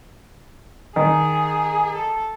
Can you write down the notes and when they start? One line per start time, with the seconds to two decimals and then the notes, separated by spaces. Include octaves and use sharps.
0.96 D#3 G#4
1.95 A4